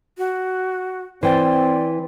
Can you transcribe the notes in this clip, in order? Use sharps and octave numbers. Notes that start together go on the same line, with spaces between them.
F#4
E3 C4 C5 D5 G5 A6